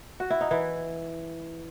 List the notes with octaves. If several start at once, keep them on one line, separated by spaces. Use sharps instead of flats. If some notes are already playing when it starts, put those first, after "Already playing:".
F#4
E4
D#4
E3 E4